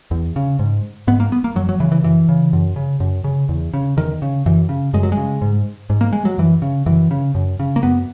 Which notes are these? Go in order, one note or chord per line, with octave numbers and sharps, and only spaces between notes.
E2
C#3
G#2
G#2 B3
A#3
B3
A#3
F#2 F#3
F#3
C#3 E3
E3
F#2 E3
C#3
F#2
C#3
F#2
C#3
E2
C#3
E2 D#3
C#3
F#2 E3
C#3
F#2 G#3
F#3
G#3
C#3
G#2
G#2
A#3
G#3
F#3
F#2 E3
C#3
F#2 E3
C#3
F#2
C#3
A#3
F#2 B3